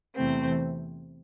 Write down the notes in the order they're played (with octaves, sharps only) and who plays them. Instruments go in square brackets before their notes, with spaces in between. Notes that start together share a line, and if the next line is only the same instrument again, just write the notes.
[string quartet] E2 C3 E3 A3 C4 C5